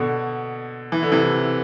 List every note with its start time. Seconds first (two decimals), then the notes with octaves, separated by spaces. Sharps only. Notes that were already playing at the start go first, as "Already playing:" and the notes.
Already playing: B2 D3
0.92 E3
1.03 D3
1.12 C3 E3